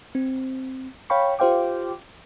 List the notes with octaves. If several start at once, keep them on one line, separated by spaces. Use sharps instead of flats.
C4
C#5 F5 G5 B5 C#6
F4 G4 C5 F5 G5 D6